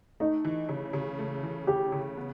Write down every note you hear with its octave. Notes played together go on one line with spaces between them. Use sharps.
A3 D#4
E3
C#3
C#3
A3
E3
C#3 G4
C#3
B3